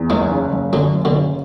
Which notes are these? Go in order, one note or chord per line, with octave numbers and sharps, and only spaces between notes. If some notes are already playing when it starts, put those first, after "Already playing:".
Already playing: E2
F#1 E3 G#3
C#3
F#1
F#2 D3 F#3
F#1
B2 D3
C#3